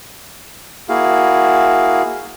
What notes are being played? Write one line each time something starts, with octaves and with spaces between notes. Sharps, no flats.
A#3 E4 F#4 G#4 F5